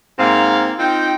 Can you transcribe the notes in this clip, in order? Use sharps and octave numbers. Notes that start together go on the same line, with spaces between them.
G#2 A#3 C4 F5
C4 D#4 F4 G5